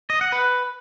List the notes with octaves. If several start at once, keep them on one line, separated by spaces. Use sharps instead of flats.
D#5
F#5
B4